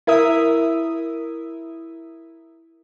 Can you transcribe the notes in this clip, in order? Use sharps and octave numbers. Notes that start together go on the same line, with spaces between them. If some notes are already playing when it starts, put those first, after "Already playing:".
E4 A#4 E5 D#6